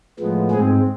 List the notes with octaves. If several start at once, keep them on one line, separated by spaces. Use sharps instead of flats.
A2 F3 G#3 B3
G#2 G#3 C4 G#4